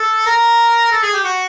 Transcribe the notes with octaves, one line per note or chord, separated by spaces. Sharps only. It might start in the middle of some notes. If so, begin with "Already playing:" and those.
Already playing: A4
A#4
A4
G#4
G4
F#4